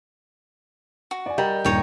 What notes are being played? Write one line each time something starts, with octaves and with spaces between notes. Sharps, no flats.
F#4
D5 G#5
G3 A#4 D#5 A#5
D#1 G2 D4 D#4 C#5 G5